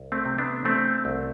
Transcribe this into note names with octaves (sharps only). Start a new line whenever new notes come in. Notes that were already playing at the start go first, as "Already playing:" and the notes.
Already playing: C2
A3 C4
C3
B3 D4
E3 A3 C4
C2